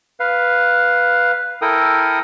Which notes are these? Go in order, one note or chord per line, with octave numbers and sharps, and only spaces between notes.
B4 F5
E4 A4 A#4 G5 D#6